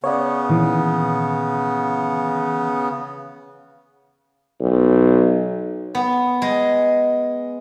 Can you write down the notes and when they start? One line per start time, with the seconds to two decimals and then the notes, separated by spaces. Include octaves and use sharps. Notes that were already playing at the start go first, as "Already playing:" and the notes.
0.04 C#3 B3 C#5 D5
0.49 A#2 D#3 E3
4.61 B1
5.95 B3
6.42 G#3